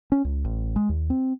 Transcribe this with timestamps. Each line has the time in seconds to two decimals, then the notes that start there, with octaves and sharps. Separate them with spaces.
0.12 C#4
0.25 C#2
0.45 A1
0.76 G#3
0.89 D#2
1.10 C4